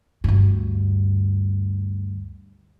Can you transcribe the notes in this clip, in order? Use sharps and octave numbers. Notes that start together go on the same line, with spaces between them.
D2 G2